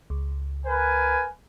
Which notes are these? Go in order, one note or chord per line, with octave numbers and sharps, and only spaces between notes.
C#2
A#4 B4 G#5